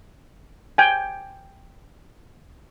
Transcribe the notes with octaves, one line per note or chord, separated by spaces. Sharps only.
G5 G#5